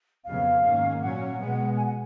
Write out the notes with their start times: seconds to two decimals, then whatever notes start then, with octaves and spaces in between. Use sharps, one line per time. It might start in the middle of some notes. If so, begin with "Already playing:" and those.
0.24 F2 C#3 F#3 B3 F5
0.62 G#2 D#3 A#3 C#4
1.01 A#2 F#3 C#4 F#5
1.39 B2 G#3 B3
1.76 G#5
1.85 F#5